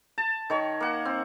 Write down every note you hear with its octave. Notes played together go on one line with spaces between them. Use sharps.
A5
D#3 C#5
A#3 F#5
C4